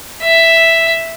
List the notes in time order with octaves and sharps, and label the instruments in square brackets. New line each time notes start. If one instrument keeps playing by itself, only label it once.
[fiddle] E5